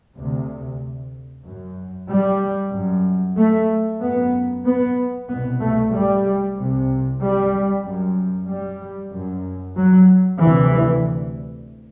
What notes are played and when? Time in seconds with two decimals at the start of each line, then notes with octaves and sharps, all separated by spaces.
0.18 D2 C3
1.45 F#2
2.09 G3
2.72 F#2
3.37 A3
4.01 F#2 B3
4.65 B3
5.29 C2 B2 B3
5.60 A3
5.92 G3
6.57 C2 C3
7.21 G3
7.84 F#2
8.48 G3
9.13 F#2
9.76 F#3
10.39 D2 C3 E3